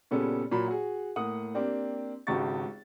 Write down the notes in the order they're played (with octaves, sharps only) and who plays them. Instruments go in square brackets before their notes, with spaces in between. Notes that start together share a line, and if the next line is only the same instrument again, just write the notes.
[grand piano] A#2 C#3 G3 B3 C#4 A4
A#2 F#3 A#5 B5
F#4 G#4
A2 A#3 F#5 D#6
A#3 C4 D4 G4
G#1 C#2 F#4 G4 C#6 A6